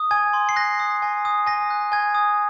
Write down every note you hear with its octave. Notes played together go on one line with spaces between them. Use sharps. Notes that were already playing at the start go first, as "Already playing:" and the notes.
Already playing: D#6
G#5 G#6
C6
C7
F#6 A#6
D#6
G#5
D#6
G#5 A#6
F#6
G#5 G#6
D#6